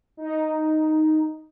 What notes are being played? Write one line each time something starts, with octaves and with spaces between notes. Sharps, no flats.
D#4